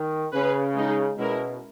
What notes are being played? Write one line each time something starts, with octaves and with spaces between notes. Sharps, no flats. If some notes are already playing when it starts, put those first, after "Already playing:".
Already playing: D#3
C#3 C#4 G#4 B4
G#3 D#4 G#4
B2 G#3 C#4 E4 A#4